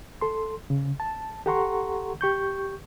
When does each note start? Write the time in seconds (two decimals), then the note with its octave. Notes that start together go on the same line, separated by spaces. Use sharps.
0.21 A4 C6
0.70 C#3
1.00 A5
1.46 G4 A4 F#5 A#5 C6 C#6
2.21 G4 C#6 G6